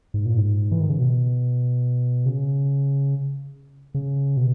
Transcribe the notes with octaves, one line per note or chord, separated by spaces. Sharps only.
G#2
A#2
G#2
E3
D#3
C#3
B2
C#3
C#3
B2